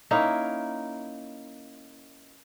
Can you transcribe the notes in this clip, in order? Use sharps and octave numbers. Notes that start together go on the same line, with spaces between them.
A#3 C#4 D#4 E4